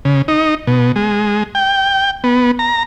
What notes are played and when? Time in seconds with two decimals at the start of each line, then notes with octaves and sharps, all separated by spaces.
0.05 C#3
0.28 D#4
0.67 B2
0.96 G#3
1.55 G5
2.24 B3
2.59 A#5